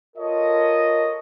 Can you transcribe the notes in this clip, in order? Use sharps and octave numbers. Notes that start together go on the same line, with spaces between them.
F4 A4 A#4 C#5 D#5